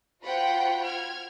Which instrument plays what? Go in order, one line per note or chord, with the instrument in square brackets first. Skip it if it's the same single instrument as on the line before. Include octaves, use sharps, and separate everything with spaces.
[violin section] F4 F#4 C5 F#5 G5 B5
F6 G#6